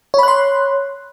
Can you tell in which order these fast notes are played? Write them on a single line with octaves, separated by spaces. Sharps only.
C#5 B5 F#6 C6